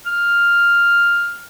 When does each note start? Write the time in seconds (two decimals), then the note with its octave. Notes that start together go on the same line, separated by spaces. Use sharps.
0.06 F6